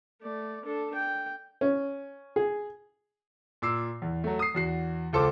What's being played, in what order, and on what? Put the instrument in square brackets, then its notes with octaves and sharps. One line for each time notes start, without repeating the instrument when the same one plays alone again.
[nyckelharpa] A3 D5
D4 A4
G5
[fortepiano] C#4
G#4
[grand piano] A#2 D6 E6 C7
E2
F#3 A3
D#6 C7
E2 F#4 C7
C#2 F4 A4 C5 D6